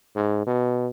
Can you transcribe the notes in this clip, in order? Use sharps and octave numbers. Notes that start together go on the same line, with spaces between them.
G#2
B2